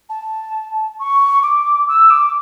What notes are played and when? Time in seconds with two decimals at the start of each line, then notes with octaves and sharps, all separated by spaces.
0.09 A5
0.99 C#6
1.42 D6
1.88 E6
2.10 D6